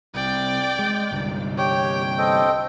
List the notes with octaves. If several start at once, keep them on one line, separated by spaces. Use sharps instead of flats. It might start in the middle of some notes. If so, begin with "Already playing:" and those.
C2 D5 G5
G#3
C2 G2 D3
G4 C#5 G5
C4 A4 D#5